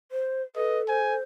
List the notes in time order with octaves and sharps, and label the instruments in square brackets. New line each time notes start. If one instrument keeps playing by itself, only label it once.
[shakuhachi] C5
[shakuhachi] A4 [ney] B4 [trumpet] D#5
[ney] C5 [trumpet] G#5